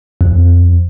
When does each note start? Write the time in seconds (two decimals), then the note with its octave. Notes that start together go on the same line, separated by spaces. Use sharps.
0.21 F2